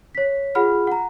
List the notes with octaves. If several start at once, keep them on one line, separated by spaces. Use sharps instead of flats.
C#5 B6
F4 G#4 F#5 B5 F6
F#5 A#5